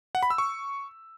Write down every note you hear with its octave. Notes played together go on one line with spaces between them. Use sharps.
F#5
B5
E6
C#6